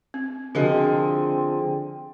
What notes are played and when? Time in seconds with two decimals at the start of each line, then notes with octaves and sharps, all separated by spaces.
0.14 C4
0.55 D3 F3 C4 F#4 G#4 A#4 D#5